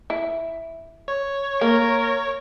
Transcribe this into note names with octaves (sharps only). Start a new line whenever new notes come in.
E4
C#5
A#3 A#4